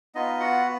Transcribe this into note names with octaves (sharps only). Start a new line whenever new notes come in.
B3 D#4 F4 D#5
F#4 F#5